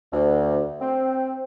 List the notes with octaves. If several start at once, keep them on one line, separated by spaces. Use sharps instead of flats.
D2
C4